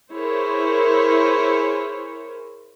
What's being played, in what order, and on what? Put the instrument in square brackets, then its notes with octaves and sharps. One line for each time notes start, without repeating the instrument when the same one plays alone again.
[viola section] E4 G#4 A#4 C5 C#5